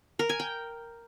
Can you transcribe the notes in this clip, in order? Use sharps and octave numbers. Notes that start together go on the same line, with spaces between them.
A#4
G#5
G5